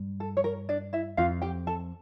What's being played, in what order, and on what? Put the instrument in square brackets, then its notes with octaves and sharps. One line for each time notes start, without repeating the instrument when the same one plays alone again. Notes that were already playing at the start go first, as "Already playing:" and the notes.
Already playing: [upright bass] G2
[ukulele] A4
C#5
A#4
D4 D5
E4 E5
[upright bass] F2 [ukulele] F4 F5
[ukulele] G4 G5
A4 A5